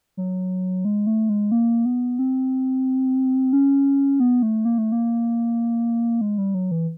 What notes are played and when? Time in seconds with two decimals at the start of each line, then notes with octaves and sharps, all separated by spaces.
0.17 F#3
0.85 G#3
1.07 A3
1.29 G#3
1.52 A#3
1.85 B3
2.19 C4
3.53 C#4
4.20 B3
4.42 A3
4.65 A#3
4.78 A3
4.92 A#3
6.21 G#3
6.38 G3
6.54 F#3
6.71 E3